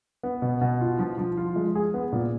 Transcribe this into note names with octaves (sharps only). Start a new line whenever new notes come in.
B3
B2
B2
F4
F3
F3
F4
G#3
G#4
B3
A#2